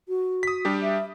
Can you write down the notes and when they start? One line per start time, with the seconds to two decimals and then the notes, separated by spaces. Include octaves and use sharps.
0.09 F#4
0.43 D#6 B6
0.65 G3 D4 G4
0.83 E5